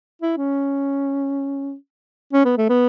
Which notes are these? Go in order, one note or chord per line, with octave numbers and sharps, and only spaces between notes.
E4
C#4
C#4
B3
A3
B3